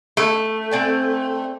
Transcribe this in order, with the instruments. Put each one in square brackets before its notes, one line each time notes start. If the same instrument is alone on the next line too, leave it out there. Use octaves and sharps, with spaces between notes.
[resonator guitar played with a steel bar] A3
[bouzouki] C4 D5 G#5